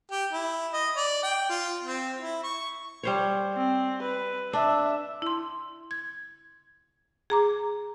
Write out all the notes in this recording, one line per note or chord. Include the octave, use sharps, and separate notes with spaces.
G4
E4
D#5
D5
G5
F4
C4
E4
C#6
G3 C5 C#5
C4
B4
D4 E5
E4 C6
G#6
G#4 A#5 D6